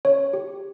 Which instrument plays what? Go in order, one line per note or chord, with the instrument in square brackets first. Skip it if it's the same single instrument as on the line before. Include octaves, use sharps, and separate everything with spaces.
[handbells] C#4 C#5
G4